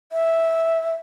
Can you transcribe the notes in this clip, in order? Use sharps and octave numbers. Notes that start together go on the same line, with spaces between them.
E5